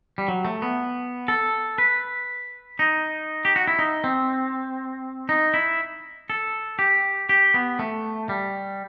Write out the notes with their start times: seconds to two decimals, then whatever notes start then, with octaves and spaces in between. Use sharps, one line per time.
0.18 G3
0.28 F#3
0.45 A3
0.62 B3
1.28 A4
1.78 B4
2.79 D#4
3.45 G4
3.56 F#4
3.67 E4
3.79 D#4
4.04 C4
5.29 D#4
5.54 E4
6.30 A4
6.79 G4
7.29 G4
7.54 B3
7.79 A3
8.29 G3